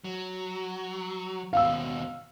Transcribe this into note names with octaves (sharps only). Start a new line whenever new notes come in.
F#3
D#2 B2 F5 E6